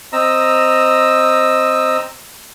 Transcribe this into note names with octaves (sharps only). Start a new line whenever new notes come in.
C4 D#5 A#5 E6